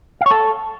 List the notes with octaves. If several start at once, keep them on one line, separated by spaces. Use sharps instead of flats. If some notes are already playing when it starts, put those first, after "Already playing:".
F5
C#5
A4